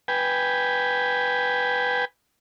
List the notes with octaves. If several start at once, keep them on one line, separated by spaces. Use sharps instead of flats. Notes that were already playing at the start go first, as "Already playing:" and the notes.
B4 G5 G#5